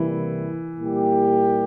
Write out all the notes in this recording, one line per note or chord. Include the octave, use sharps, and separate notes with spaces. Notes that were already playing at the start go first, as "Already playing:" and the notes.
Already playing: C3 E3 G3 A#3 E4
A#2 G3 A#3 E4 G4